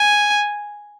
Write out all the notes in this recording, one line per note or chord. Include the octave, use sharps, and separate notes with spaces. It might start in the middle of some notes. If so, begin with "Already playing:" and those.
Already playing: G#5